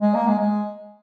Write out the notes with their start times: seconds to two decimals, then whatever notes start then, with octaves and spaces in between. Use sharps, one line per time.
0.01 G#3
0.15 A#3
0.27 G#3
0.39 G#3